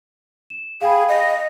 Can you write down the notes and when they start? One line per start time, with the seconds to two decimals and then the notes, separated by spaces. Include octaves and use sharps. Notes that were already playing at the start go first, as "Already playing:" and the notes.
0.50 E7
0.81 G#4 F5 G5 B5
1.09 D#5